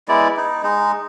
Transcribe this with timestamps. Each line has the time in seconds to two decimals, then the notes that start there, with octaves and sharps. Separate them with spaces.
0.08 G#3 B3 E4 D5
0.37 D#4
0.63 G#3 D#4